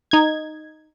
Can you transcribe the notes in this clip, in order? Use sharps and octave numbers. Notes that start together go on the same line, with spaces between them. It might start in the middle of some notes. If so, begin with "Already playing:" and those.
D#4 G#6